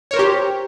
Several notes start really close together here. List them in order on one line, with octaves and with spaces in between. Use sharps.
C#5 A#4 C5 G4